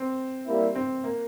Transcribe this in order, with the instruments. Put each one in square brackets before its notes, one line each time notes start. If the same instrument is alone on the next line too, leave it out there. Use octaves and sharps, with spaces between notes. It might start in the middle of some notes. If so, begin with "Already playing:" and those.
Already playing: [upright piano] C4
[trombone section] G3 A#3 E4
[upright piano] C4
A#3